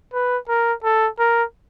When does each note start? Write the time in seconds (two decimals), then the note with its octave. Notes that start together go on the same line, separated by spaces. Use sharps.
0.13 B4
0.49 A#4
0.84 A4
1.19 A#4